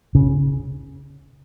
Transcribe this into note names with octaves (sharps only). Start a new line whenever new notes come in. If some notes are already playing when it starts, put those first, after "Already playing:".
C#3